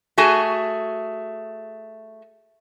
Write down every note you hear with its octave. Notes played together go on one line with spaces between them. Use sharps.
A3 F#4 G#4 G#5